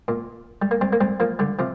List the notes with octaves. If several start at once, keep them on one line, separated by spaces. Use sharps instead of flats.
A#2
G3
A#3
G3 C4
A#3
G3 C4
F3 A#3
D3 G3
C3 F3